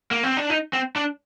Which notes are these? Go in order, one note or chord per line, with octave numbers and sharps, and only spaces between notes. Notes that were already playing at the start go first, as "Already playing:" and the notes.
A#3
C4
D4
D#4
C4
D4